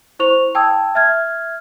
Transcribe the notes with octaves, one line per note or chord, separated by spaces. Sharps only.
E4 C5 C#6 F7
G5 A5 D#6 E6 G#6
E5 F6 G#6